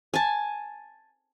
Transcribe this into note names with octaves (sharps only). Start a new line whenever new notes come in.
G#5 A5